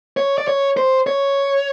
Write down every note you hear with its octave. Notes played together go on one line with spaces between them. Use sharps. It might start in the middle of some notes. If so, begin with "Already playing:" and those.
C#5
D5
C#5
C5
C#5